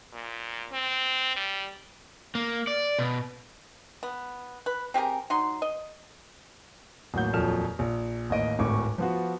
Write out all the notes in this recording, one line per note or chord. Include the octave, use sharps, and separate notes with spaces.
A#2
C4
G3
A#3
D5
B2
B3
B4
C4 G4 G#4 A#4
F#3 D#4 C6
D#5
A1 D#2 F#3 F#5 G6
D#1 F2 F#3 A4 F6 E7
A#1
A1 D#2 D#5 D7
D1 G#1 A2 C#6 D6
F3 B3 F4 F#4